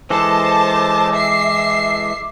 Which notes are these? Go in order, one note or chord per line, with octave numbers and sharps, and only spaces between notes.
E3 G#3 A4 C5 A5 D6
E5 C7